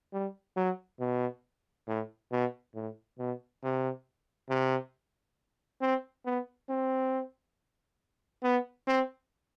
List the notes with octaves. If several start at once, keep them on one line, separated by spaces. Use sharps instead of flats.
G3
F#3
B2
A2
B2
A2
B2
C3
C3
C4
B3
C4
B3
C4